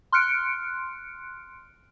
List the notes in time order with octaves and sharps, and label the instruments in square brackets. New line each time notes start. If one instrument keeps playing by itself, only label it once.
[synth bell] C6 F6 F#6 C#7 D7